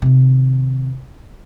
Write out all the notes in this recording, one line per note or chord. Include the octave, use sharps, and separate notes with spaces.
C3 D#3